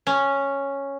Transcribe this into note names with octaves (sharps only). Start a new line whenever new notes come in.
C#4